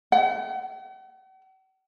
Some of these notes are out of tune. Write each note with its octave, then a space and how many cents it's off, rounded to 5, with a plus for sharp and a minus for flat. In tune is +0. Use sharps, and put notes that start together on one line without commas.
F#5 +45